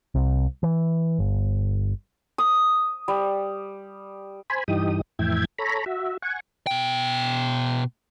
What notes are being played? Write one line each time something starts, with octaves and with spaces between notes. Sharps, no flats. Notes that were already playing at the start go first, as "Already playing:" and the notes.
C2
E3
G1
D#6
G3
C5 G#5 B5
G2 E3 D#4 G4 D#6
F2 A2 E3 E5 G5 G#6
A4 C#5 A#5 B5
F#4 E5
F#5 G#5 C#6
B2 G5